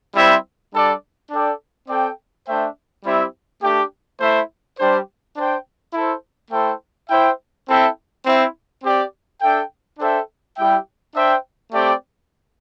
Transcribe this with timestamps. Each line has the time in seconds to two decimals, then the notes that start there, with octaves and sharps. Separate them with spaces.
0.15 G3 C4 E4 C5 E5
0.73 G3 D4 A4 D5
1.31 D4 A4 D5 G5
1.88 C4 A4 D5 G5
2.46 A3 D4 C5 E5 G5
3.04 G3 C4 E4 G4 E5
3.62 A3 D4 G4
4.20 A3 E4 C5 E5
4.78 G3 D4 G4 C5
5.36 D4 C5 G5
5.93 E4 A4 C5
6.51 A3 E4 A4 C5 G5
7.09 E4 C5 E5 G5
7.68 C4 E4 A4 E5 G5
8.25 C4 E4 C5 E5
8.83 C4 G4 D5
9.41 D4 A4 E5 G5
9.99 D4 A4 C5 E5 G5
10.57 G3 E4 G4 E5 G5
11.14 D4 C5 E5 G5
11.72 A3 C4 G4 D5 G5